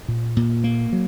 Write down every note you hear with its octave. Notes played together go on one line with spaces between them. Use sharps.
A#2
A#2
A#3
F#3